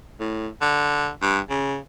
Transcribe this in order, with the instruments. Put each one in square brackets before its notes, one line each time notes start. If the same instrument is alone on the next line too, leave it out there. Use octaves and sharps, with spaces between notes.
[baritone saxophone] A2
D3
G2
C#3